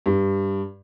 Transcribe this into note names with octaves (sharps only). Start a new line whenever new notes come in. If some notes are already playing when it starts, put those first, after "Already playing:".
G2